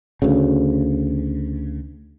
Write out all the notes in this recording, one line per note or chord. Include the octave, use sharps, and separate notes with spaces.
D2 C#3